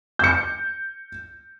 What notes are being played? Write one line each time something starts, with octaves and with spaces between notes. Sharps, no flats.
G6 C#7